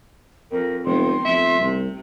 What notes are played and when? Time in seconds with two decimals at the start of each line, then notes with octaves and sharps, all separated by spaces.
0.51 F2 A#4
0.85 F1 D#3 G#3 B3 C6
1.25 F2 A3 E5
1.60 C2 C3